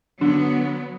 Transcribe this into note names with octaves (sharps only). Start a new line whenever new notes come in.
D3 F#3 B3